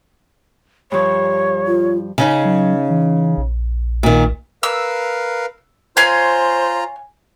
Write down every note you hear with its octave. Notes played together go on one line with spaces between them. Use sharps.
G2 F3 C#5
F4
C#3 C#4 D#4
F#3
E3
A#1
A#2 D#3
A#4 B4 F5 E6
F4 C5 C#5 F5 G#5 A#5